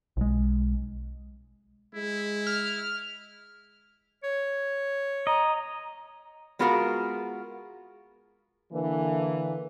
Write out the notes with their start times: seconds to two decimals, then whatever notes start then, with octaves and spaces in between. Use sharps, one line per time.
0.17 B1 G#3
1.95 G#3 E4
2.47 F6
4.24 C#5
5.27 D#5 A#5
6.59 G#3 B3 F4 F#4 G#4 A#4
8.72 D3 E3 A#3